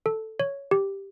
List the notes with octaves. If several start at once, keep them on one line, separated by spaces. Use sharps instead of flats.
A4
C#5
G4